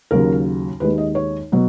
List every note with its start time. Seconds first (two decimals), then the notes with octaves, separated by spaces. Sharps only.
0.11 D#2 C#3 F#3 A#4
0.80 D#2 D#3 G#3 B4
0.98 D#5
1.15 C#5
1.52 B2 F#3